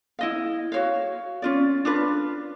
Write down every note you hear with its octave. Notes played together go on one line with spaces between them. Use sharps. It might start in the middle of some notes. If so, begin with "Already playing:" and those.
E4 D#5 F5
F#4 C#5 F5
C#4 F4 D5
D4 F4 B4